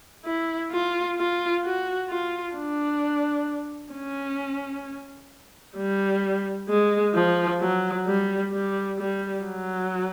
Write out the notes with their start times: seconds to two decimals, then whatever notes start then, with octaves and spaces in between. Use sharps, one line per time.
0.25 E4
0.71 F4
1.17 F4
1.63 F#4
2.09 F4
2.55 D4
3.93 C#4
5.77 G3
6.69 G#3
7.14 F3
7.60 F#3
8.06 G3
8.52 G3
8.98 G3
9.44 F#3